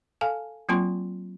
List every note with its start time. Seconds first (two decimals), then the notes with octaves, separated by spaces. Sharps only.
0.21 A4 F5 G#5 A5
0.69 F#3 A#3 C4 F4 A5 C6